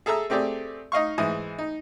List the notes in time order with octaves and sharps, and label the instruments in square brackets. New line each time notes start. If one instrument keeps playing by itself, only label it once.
[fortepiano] G#4 A4 E5 A#5 E6
A3 C4 G4 G#4 D5
D#4 D#5 F5 C#6
G#2 E3 D#6
D#4